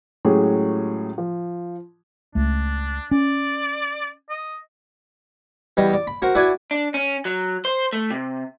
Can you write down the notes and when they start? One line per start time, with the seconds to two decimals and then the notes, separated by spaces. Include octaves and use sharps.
0.25 A2 F#3 G#3 C#4 G4 G#4
1.18 F3
2.35 C#2 A3 D4
3.11 C#4 D5
4.29 D#5
5.77 E2 G3 D#5
5.93 D5
6.07 B5
6.22 F#4 A#4 C5
6.35 E4 F#4 B4 D5 G#5
6.71 D4
6.94 C#4
7.25 F#3
7.65 C5
7.93 A3
8.10 C3